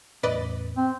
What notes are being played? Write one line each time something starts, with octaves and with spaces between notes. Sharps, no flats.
E2 A2 C#4 B4 D5 D#5
C4